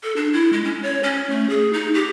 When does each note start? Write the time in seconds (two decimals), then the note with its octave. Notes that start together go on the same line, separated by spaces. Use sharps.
0.03 A4
0.17 D4
0.33 E4
0.53 G#3
0.65 C#4
0.83 C#5
1.03 C#4
1.30 A3
1.50 G#4
1.73 D#4
1.94 G4